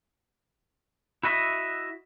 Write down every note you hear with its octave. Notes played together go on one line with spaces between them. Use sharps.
E4 F#4 D#5 E5